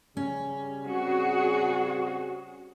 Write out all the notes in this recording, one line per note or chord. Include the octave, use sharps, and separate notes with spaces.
C#3 G3 C#4
C#3 G3 C4 F#4 G#4